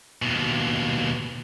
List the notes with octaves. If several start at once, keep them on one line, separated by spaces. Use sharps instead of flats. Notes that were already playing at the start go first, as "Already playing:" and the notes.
D#2 B2